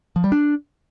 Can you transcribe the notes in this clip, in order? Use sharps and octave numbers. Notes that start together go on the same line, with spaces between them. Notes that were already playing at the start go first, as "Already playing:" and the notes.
F3
G3
D4